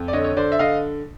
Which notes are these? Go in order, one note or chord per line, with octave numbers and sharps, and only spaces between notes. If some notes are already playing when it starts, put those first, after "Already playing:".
Already playing: F2
D5
D3 C#5 D#5
C#5
D3 C5 D5
E5
D3 D#5 F5